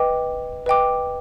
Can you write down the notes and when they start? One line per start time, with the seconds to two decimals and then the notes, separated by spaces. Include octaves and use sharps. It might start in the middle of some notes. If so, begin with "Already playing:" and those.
Already playing: B4 D#5 G5 D6
0.66 B4 D#5 G5 D6